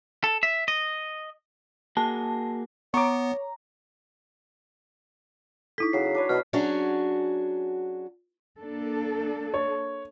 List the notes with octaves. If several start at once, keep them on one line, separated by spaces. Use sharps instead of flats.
A4
E5
D#5
A#3 F#4 G#4 A5
B3 C#5 A#5 C#6 D6
D#4 E4 A4 B6
C#3 F#3 F#4 C7
D4 B4 C#5
B2 D4 E4 F6
F#3 C#4 D4 F#4 G#4
A#3 D4 A4
C#5